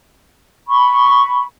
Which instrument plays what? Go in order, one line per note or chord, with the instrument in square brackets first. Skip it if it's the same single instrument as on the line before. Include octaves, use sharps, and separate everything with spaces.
[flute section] B5 C#6